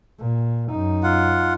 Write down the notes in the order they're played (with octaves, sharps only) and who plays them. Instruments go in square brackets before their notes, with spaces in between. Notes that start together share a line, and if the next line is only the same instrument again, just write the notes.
[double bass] A#2
F#2 D#4
[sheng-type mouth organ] F4 F#5